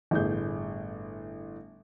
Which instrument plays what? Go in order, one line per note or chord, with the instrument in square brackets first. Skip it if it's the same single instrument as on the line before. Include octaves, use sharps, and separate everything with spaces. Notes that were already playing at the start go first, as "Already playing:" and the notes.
[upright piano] G1 A2 G#4 G6